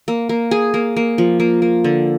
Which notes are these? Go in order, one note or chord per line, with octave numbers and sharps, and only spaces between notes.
A#3
A#3
G#4
A#3
A#3
F3
A#3
A#3
D3